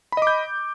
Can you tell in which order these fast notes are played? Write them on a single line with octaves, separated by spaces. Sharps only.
B5 D#5 D6 G6